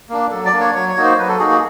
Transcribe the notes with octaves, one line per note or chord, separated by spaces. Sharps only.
A#3 D4
F#3 A4
D5
A#3 D4
C#5
F#3 C#5
C#5
A#3 D#4 F#4
C5
F#3 B4
A4
A#3 D#4 F#4 G#4
G#4